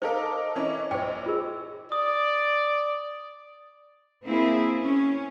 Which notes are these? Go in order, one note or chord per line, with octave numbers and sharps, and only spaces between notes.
D#4 A4 A#4 C5 D#5 F5 D6
E3 C#4 E4
A#1 C5 C#5 G5
F4 G#4 A#4
D5 D#6
A#3 C4 E4 G#4
C#4